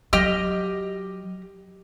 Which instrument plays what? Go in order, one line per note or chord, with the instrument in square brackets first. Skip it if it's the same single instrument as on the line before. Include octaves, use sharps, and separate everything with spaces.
[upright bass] F#3 [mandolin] G4 D#5 F6